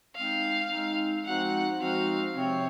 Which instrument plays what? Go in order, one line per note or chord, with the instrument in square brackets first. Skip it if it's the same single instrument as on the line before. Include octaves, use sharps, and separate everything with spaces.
[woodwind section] G#3 C4 D#4 [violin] F5
[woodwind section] G#3 C4 D#4
[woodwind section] F3 G#3 C4 D#4 F#4 [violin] F#5
[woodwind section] F3 G#3 C4 D#4 F#4 [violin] F5
[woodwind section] C3 F3 C4 [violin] C#5